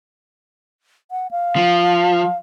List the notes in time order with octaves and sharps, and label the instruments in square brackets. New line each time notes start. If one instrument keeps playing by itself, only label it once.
[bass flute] F#5
F5
[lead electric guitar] F3